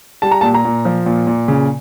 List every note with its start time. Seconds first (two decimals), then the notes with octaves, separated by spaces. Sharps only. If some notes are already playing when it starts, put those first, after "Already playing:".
0.22 G3 A5
0.31 A#5
0.41 A#2 A5
0.54 A#5
0.65 A#2
0.85 F3
1.06 A#2
1.27 A#2
1.48 C#3